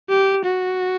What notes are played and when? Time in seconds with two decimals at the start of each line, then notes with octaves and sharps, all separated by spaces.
0.09 G4
0.44 F#4